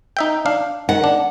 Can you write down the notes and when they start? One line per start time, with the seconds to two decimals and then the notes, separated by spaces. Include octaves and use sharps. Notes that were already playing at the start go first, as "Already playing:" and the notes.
0.17 D#4 E5 G5
0.46 D4 F5
0.89 D#3 F#5
1.04 D4